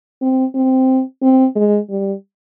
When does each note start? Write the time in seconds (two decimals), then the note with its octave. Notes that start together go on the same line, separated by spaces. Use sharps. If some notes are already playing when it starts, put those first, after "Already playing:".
0.22 C4
0.55 C4
1.22 C4
1.56 G#3
1.90 G3